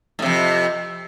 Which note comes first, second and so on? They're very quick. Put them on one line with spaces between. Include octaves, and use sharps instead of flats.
A2 C3 F2